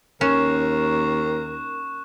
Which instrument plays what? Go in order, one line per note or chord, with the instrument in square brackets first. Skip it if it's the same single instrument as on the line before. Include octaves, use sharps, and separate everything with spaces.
[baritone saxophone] D#2 [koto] C#4 [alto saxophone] A#4 [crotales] C#6 F#6 E7